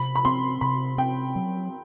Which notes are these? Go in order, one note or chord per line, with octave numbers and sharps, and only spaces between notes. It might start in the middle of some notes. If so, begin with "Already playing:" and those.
Already playing: C3 B5
B5
C4 C6
C3 B5
C4 G5
F#3